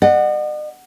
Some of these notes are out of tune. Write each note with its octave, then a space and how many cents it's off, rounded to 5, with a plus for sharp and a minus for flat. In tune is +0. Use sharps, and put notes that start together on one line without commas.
D#5 -45 F#5 +0